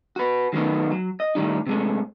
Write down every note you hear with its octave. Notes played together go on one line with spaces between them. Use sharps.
F#4 B4
D#3 F#3 A3 B3 D#4
F#3
D#5
A2 D#3 G3 D#4
C3 G#3 A3